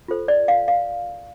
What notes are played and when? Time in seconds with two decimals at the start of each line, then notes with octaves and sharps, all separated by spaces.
0.08 F4 A4 C5
0.28 D5
0.48 F5
0.68 F5